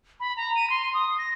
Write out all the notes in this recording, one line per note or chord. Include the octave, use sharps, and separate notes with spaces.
B5
A#5
D#7
C6
D#6
A#6